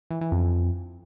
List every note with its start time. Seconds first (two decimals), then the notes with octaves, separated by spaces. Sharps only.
0.11 E3
0.21 E3
0.32 F2